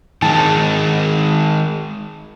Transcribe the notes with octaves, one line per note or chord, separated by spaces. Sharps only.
D#3 G#3 A5